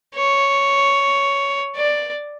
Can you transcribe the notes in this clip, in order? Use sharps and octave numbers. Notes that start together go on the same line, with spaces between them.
C#5
D5